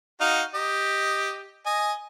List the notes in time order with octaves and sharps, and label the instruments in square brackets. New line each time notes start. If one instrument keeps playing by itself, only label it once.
[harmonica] D#4 F#4 F5
G4 D#5
D#5 G#5